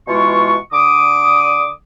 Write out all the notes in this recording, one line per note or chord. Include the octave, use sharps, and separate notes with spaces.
B2 E3 G#3 F4 C#6
D3 D6 D#6